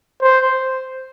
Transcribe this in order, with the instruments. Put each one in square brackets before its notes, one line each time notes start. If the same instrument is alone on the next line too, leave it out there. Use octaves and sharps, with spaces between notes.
[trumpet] C5